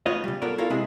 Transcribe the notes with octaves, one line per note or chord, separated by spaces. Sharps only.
A3 B3 F4 B4 C#5 D#5
C#3 G3
B3 F4 A4 A#4 C#5 D5
E4 F4 A4 A#4 C#5 F5
C3 G#3 C4 E4 G#4